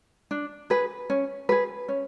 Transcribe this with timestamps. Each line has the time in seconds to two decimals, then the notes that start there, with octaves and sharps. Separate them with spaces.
0.31 D4
0.70 G#4 B4
1.10 C#4
1.49 G#4 B4
1.88 C#4